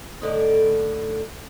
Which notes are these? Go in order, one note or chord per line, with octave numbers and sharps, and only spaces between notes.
A2 D3 D#4